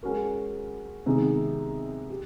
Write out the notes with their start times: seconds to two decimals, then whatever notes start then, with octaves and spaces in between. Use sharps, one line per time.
0.03 G#3 C#4 F#4 A#4
1.06 C3 D#3 G#3 B3 D#4
2.10 G4